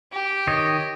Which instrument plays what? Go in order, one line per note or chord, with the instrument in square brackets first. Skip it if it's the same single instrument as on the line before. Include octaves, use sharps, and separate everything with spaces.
[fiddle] G4
[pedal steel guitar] D#3 C#5 D#5